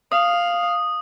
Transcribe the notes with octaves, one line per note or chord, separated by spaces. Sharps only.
F5 D#6